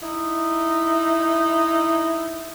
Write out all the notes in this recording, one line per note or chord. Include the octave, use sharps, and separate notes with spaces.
D#4 E4